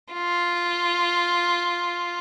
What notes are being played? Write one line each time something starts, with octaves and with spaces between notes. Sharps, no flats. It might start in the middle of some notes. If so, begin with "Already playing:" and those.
F4